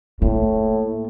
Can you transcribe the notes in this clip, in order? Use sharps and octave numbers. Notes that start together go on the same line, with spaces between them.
A2 A#3